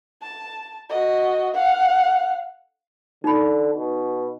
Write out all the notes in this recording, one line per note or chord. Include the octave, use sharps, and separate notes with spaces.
A5
F#4 D#5
F5 F#5
D3 D#4 B5
B2